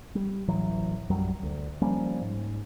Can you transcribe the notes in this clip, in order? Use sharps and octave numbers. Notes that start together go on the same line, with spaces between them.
G3
D1 A1 E3 F#3
A#1 F#2 F#3 G3
D2
F3 G3 A#3 C#4
G#2